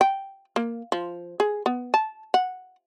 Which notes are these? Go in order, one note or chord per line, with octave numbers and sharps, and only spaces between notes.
G5
A#3
F3
G#4
B3
A5
F#5